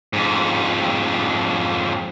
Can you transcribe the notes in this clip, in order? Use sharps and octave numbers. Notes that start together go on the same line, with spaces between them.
F2 G#2